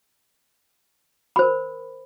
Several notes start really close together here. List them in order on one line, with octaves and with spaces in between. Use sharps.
B5 C5 A#4